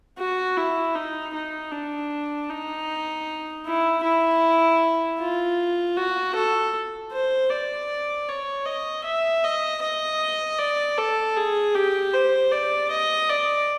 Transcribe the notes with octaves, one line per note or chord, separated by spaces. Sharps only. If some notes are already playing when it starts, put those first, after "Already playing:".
F#4
E4
D#4
D#4
D4
D#4
E4
E4
F4
F#4
A4
C5
D5
C#5
D#5
E5
D#5
D#5
D5
A4
G#4
G4
C5
D5
D#5
D5